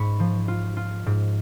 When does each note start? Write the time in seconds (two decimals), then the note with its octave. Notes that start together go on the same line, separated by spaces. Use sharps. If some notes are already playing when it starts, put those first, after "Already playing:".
Already playing: G#2 B5 C#6
0.20 F3
0.48 F4
0.77 F4
1.06 G#2